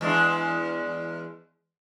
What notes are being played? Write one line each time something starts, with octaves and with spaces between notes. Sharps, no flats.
E2 G#3 D4